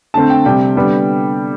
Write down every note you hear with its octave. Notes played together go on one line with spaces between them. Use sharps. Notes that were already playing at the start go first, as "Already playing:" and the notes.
D3 A3 C4 A5
G5
C3 G3 C4 G5
D3 G3 B3